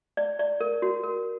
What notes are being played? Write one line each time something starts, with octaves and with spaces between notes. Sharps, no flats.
D5
D5
A#4
F#4
A#4